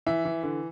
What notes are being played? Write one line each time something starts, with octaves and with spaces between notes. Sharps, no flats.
E3 E5
E3
D3